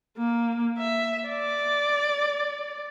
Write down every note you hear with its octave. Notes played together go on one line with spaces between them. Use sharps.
A#3
E5
D5